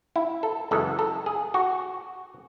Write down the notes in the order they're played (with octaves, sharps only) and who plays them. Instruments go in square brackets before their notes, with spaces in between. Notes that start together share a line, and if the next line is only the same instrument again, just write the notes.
[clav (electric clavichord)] E4
A4
F#2 C#3 E3 G#3 A4
A4
G#4
F#4